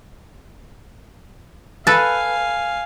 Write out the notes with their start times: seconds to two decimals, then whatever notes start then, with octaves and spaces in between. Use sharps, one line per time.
1.87 A4 B4 F5 G#5